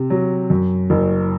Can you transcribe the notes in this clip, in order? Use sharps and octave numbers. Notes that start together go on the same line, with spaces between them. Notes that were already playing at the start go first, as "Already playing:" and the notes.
Already playing: C3
F#3
F#2
F#1